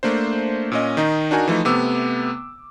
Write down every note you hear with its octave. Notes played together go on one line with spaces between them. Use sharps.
A3 A#3 D4 C5
A#2 C#4 D#5
D#3 D#4
D4 D#4 F#4 A#4 G#5
E3 F3 A3 D#4
C3 A3 B3 D6 E6